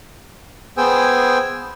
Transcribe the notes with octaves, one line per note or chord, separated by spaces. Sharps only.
B3 G#4 C5 G5 G#5 E6